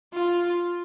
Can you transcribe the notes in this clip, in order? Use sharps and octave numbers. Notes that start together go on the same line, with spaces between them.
F4